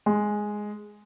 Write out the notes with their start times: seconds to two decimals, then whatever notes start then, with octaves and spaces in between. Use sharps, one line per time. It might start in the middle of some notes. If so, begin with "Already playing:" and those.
0.06 G#3